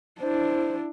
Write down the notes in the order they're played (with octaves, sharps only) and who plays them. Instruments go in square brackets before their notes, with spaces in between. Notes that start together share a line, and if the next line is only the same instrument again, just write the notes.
[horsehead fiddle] D4 E4 [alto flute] C5